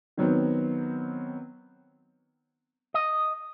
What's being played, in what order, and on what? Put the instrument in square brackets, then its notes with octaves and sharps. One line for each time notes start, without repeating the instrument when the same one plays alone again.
[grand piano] D#3 F#3 B3 C4
[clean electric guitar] D#5